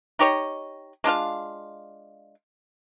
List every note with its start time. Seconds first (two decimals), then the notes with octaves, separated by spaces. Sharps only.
0.19 D#4 G4 C#5 D#5
1.04 G#3 D4 F4 F5